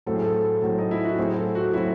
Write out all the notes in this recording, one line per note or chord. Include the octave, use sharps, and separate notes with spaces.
A2 F#3 C4 A4
G#4
A4
A2 F#3 C4
D#4
E4
F#4
A2 F#3 C4 G#4
A4
F#4
A2 F#3 C4 E4